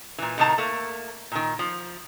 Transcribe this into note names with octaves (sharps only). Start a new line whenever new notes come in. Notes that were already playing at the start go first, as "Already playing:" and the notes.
A#2 E3
A2 C3 D#3 C4 A5 A#5
A3 A#3
A#2 D#3
F3